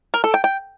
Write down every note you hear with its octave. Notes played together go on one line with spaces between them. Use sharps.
A#4
A4
G5
G5